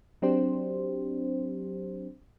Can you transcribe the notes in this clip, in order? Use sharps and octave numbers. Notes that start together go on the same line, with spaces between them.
F#3 C4 D4 G4 C5